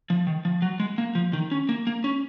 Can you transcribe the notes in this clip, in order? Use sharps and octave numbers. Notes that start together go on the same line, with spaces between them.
F3
D#3
F3
F#3
G#3
A#3
F3
D#3
C#4
A#3
A#3
C#4